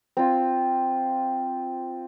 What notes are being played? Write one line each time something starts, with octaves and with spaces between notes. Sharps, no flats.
C4 F4